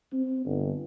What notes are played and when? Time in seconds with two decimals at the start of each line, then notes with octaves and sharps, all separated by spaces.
0.12 C4
0.46 G1